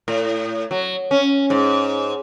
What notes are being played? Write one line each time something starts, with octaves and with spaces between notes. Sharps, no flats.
A2
F#3
C#4
G#2